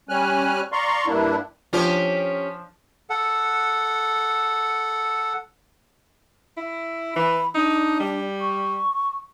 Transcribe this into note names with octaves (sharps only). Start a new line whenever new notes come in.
G3 C#4 G#5 F6 F#6
D5 F5 A#5 C6 C#6
G2 A#3 D4 E4
F3 C#4 D4 G4
A4 F#5
E4
E3 B5
D4 D#4
G3
C#6